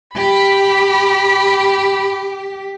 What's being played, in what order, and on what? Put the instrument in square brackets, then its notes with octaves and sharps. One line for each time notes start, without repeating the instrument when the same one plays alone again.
[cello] G4 [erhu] B5